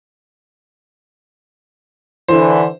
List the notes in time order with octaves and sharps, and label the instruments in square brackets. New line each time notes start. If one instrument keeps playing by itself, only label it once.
[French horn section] D3 E3 [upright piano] C5